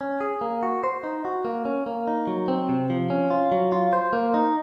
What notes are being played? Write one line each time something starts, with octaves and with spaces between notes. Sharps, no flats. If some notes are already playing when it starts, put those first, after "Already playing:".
C#4
G#4
A#3
F#4
C5
D#4
F#4
A#3
C#4
A#3
D#4
F#3
C4
C3
F3
C#4
F4
F#3
F4
C5
A#3
D#4